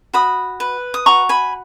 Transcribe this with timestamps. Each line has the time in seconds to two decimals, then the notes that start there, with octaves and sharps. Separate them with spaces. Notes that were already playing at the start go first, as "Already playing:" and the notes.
0.13 F#4 B5 D#6
0.60 B4
0.94 D#6
1.06 F#4 A#5 C#6
1.29 G#5 B5